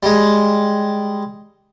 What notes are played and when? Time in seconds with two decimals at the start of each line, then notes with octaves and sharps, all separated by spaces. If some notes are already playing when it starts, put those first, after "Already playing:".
0.03 G3 G#3